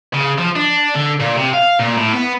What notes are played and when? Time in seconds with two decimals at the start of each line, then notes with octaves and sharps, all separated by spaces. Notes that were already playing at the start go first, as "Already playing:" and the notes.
0.14 C#3
0.38 F3
0.56 D4
0.95 D3
1.20 A#2
1.37 C3
1.54 F5
1.79 A#2
1.97 A2
2.13 B3